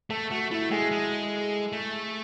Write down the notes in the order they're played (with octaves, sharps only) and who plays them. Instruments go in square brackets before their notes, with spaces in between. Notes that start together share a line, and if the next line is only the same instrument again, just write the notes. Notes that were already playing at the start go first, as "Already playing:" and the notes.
[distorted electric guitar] A3 [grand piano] A4
[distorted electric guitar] A3 [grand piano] F#4
[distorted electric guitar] A3 [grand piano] E4
[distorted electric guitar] G#3 [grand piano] G#4
[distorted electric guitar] G#3
A3